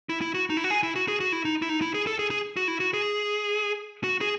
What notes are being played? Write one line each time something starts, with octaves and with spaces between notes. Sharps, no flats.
E4
E4
F#4
D#4
E4
F#4
G#4
E4
F#4
G#4
F#4
E4
D#4
E4
D#4
E4
G#4
A4
G#4
G#4
F#4
E4
F#4
G#4
F#4
G#4